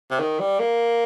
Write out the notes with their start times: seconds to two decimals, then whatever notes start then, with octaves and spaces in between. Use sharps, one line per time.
0.10 C3
0.20 D#3
0.39 G3
0.59 A#3